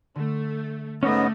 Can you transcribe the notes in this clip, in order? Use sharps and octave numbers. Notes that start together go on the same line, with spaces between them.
D3 A3
G#2 A3 B3 C#4 D#5 D6 A#6